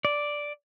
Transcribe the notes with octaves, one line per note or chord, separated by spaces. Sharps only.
D5